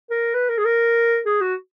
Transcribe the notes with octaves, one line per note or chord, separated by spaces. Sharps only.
A#4
B4
A#4
G#4
A#4
G#4
F#4